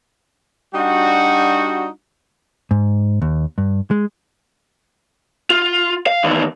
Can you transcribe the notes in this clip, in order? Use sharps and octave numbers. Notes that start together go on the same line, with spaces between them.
G3 D4 D#4 F#4
G#2
D#2
G2
G#3
F4
F5
E2 D#3